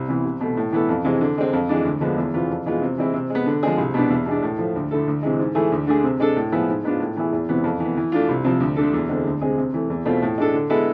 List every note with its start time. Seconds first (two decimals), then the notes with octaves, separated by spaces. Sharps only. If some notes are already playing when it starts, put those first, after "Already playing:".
Already playing: C2
0.08 C3 E3 B3
0.25 C2
0.41 B2 A3
0.57 A2
0.72 E3 B3 E4 A4
0.89 F2
1.05 C3 E3 G#3
1.21 D3
1.38 G#3 C4
1.53 F2
1.69 E3 G#3 D4
1.85 D2
2.01 D3 F3 G#3 B3
2.17 E2
2.34 C3 E3 B3 F4
2.50 F2
2.66 E3 G#3 B3 F4
2.82 C3
2.98 E3 G#3 C4 E4
3.14 C3
3.30 G#3
3.35 B3
3.46 D3
3.63 F3 G#3 C4 G#4
3.78 C2
3.94 B2 B3 D4
4.10 E2
4.26 B2 G#3 D4
4.42 A2
4.59 F3 A3
4.75 D2
4.91 D3 A3 E4 A4
5.08 D2
5.23 C3 E3 G#3
5.39 G#2
5.55 E3 A3 E4 G#4
5.72 D2
5.87 D3 A3 D4 G#4
6.04 C3
6.20 G#3 D4 A4
6.36 A2
6.52 F3 B3 E4 G#4
6.68 G#2
6.84 G#3 B3 D4 F4
7.00 A2
7.16 E3 B3 E4 G#4
7.32 E2
7.49 C3 E3 B3
7.64 F2
7.80 E3 B3
7.97 E3
8.12 A3 D4 F4
8.29 C2
8.44 C3 F3
8.60 D2
8.76 D3 A3 D4 A4
8.94 E2
9.09 D3 G#3 C4
9.26 D2
9.41 C3 G#3 C4 G#4
9.58 C3
9.74 E3 A3
9.90 E2
10.05 B2 A3 C4 F4
10.22 A2
10.38 G#3 D4 A4
10.53 D3
10.70 G#3 B3 E4 A4